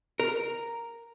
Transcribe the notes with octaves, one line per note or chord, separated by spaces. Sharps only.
A#4